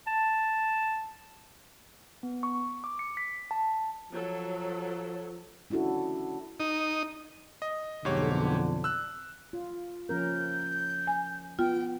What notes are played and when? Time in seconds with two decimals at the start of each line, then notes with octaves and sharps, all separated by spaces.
0.07 A5
2.23 B3
2.43 C#6
2.84 D6
2.99 C#7
3.17 B6
3.51 A5
4.12 F3 F#3 A4
5.70 C#4 D4 E4 F#4 A4
6.60 D#4
7.62 D#5
8.05 B1 F2 G#2 D3 G4 C#5
8.84 E6 F#6
9.53 F4
10.09 F3 C#4 A#4 G6
11.07 G#5
11.59 B3 F4 G5